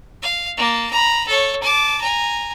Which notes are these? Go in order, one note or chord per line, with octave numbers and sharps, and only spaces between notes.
F5
A#3 A5
A#5 B5
A4 C#5
A5 D6
G#5 A#5